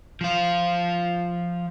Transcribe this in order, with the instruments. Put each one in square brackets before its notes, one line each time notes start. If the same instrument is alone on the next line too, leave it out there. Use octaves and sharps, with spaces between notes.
[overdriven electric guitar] F3 F4